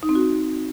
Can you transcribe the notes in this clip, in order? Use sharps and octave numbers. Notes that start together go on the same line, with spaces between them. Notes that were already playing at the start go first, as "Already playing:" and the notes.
D#4
C4
F#4